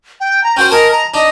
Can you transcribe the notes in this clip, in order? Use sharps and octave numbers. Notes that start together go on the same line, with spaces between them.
G5
A#5
C#4 F#4 C5 G5
A#4 D#5 G#5 A5
A#5
D4 D#4 D#5